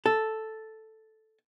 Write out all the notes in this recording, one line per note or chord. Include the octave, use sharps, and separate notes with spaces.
A4